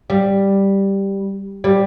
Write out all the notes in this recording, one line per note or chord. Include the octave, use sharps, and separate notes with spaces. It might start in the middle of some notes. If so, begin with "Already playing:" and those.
G3
G3